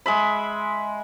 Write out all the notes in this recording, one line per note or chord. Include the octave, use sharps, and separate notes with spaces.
G#3 E5 B5